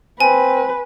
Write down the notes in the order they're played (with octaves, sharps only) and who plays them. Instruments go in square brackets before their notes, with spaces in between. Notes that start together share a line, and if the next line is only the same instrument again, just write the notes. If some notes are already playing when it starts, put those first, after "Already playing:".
[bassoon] C4 [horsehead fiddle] B4 [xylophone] G#5